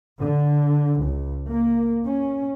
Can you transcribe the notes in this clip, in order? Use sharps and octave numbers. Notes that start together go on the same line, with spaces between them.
D3
C#2
A#3
C#4